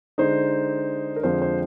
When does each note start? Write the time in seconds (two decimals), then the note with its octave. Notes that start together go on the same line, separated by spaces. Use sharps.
0.18 D3 G#3 D#4 C5
1.16 A#4
1.23 F2 D3 F3 G#3 C4 C5
1.42 C5